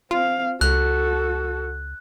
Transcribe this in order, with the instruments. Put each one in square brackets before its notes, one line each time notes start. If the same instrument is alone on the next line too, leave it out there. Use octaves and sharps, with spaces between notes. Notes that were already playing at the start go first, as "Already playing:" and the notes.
[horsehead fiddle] C4 F5 [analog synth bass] F4
[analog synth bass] C#2 [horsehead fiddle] F#4 A4 [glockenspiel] F#6